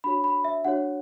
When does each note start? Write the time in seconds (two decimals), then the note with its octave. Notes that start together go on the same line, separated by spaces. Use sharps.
0.04 D4 F#4 C#5 B5
0.24 B5
0.45 E5
0.65 D4 F#4 C#5 F#5